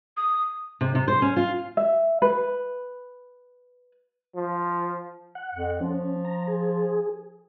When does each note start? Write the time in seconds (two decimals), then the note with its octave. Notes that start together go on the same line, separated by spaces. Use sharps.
0.17 D#6
0.81 C3
0.95 C3
1.08 C5
1.22 C#4
1.37 F4
1.77 E5
2.22 B4
4.35 F3
5.35 F#5
5.54 F2
5.81 F3 C#4
6.25 A#5
6.47 G#4